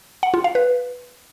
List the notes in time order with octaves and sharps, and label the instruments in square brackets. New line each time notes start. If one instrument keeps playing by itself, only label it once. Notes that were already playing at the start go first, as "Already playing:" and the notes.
[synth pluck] F#5
F4
F5
B4